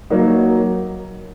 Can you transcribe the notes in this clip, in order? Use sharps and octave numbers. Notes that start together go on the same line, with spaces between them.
F#3 A#3 D#4 F#4